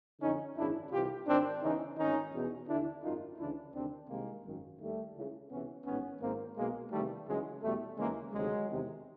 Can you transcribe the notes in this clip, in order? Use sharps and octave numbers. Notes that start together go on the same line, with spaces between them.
F2 D3 C#4 D#4
G#1 F#2 C#3 E3 D4 E4
C2 C3 E3 F4 G4
G#1 G#2 D#3 C4 D4
E2 C#3 E3 C#4 D#4
G#1 G#2 D#3 C#4 D#4
E2 B2
D#2 D3 D4 E4
G#1 F#2 D#3 D#4 F4
D2 C#3 E3 D4 E4
D2 C3 D#3 C4 D4
C2 C3 D#3 G#3 A#3
G#1 F#2 D#3
D#2 D#3 G3 A3
C#2 C#3 E3
C#2 C3 E3 B3 C#4
A1 G#2 D#3 B3 C#4
G#1 G#2 D#3 A#3 C4
B1 B2 G#3 A#3
E2 C3 D#3 G3 A3
C#2 C#3 E3 F#3 G#3
E2 B2 G3 A3
D#2 C#3 E3 G#3 A#3
D2 C3 D#3 F#3 G#3
E2 C3 D#3